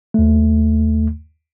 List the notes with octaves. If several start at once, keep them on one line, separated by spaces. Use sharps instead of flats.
D#2 A3